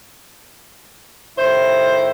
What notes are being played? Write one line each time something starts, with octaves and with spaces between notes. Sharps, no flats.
A2 D#3 E4 C5